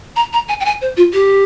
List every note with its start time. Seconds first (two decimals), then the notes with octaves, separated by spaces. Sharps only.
0.16 A#5
0.33 A#5
0.49 G#5
0.60 G5
0.65 G#5
0.82 C5
0.97 F4
1.13 G4